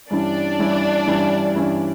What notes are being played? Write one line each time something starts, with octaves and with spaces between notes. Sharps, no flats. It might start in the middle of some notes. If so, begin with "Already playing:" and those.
G2 E3 G3 C#4 D4 E4 D5
G2 E3 G3 C#4 E4
G2 E3 G3 C#4 E4
G2 E3 G3 C#4 E4